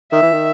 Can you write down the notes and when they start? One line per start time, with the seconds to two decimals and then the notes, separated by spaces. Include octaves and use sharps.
0.12 D#3 E5
0.22 E3
0.32 D#3